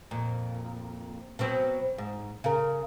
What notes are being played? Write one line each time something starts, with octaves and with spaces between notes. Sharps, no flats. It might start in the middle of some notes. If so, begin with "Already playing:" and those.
F2 A#2
B2 F#3 C4
G#2
C#3 A#4